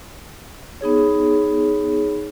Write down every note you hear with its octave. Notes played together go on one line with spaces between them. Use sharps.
B3 D#4 G#4 C#5